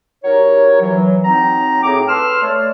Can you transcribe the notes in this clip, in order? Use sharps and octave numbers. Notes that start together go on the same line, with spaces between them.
F#3 D#4 G4 A#4 C#5
E3 F#3
F#3 C4 D#4 A#5
A2 C4 G#4 D6
A4 B4 C6 E6 F6
A3 C#5 D5